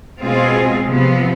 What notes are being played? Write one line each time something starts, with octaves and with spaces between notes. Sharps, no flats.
B2 G#3 C4 F4 G#4
C3 F3 B3